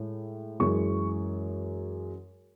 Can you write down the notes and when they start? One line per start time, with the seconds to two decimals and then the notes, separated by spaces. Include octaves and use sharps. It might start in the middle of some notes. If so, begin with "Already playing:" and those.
Already playing: A2 G#3
0.59 F#2 E3 G#3 C#6